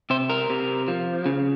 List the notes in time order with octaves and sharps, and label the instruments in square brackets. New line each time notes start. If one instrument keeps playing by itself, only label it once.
[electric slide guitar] C3 C5
A#4
C3
F3
C#3